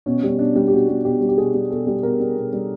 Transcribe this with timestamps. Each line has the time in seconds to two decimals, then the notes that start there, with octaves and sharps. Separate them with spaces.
0.06 B2 C#4
0.23 G3 C#4
0.39 B2 D4
0.56 G3
0.68 G4
0.72 B2 F#4
0.88 G3
1.05 B2 G4
1.21 G3
1.29 G4
1.38 B2 G#4
1.54 G3
1.70 B2 A4
1.87 G3
2.03 B2 A#4
2.20 G3
2.37 B2
2.53 G3